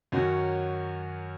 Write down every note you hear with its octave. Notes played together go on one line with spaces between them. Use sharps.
F#2 D#3 F#3 C#4 F#4